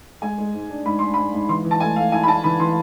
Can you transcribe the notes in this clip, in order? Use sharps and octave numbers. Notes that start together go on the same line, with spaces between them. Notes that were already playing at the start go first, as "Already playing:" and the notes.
G#3 G#5
G#3
G#2
D4
G#2 B5
D4 C6
G#2 B5
G#2
E3 C6
E3
A5
A3 G#5
A3 F5
E4 G#5
B5
E4 A5
E3 B5
E3 C6